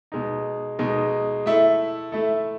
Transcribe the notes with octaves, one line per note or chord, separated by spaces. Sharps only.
B2 G#3 D#4
B2 G#3 D#4
A3 E4 A4
A3 E4 A4